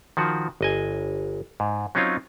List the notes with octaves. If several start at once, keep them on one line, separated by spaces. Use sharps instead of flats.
D#3 F3 F#4
G1 D#5 G#5
G#2
F#3 C4 C#4 D#4 F4